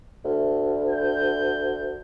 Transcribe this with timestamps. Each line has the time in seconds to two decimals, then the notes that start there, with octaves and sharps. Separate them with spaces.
0.25 D2
0.90 G6